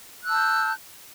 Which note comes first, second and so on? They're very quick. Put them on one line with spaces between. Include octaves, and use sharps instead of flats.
F#6 E6 A5 G6